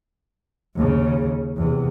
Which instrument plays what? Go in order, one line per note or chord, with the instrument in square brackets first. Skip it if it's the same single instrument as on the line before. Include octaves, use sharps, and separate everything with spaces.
[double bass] D#2 C#3
E2 C3